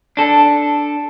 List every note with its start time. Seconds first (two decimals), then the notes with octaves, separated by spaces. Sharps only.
0.17 D4 A4